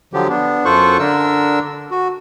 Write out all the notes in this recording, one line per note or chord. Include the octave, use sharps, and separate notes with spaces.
D3 F3 F#3 G4
B3 D4
F#2 F4 A4 C5 C#6 F#6
D3 D4 A#4 E6
F#4